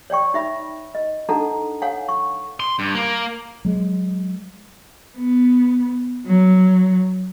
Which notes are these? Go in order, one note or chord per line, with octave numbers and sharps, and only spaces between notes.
C#5 D5 G5 C#6
D#4 E5 B5
D#5
D4 D#4 A4 F#5 A5 A#5
C#5 F5 F#5 G#5
C#6
C6
G2
A#3
F#3 G#3
B3
F#3